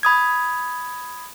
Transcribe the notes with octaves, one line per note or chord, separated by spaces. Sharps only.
B5 D#6 G#6